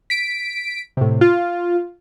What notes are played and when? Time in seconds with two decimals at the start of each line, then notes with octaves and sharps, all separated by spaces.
0.10 B6 D7
0.97 A2 C3
1.21 F4